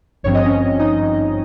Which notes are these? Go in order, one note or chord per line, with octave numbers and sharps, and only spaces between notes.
G#1 G2 F3 C4 C#5
D#5
C#4 C#5
D#4 D#5